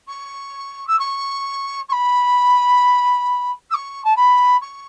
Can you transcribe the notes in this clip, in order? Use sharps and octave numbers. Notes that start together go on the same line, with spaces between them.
C#6
E6
C#6
C#6
B5
E6
C#6
A5
B5
C#6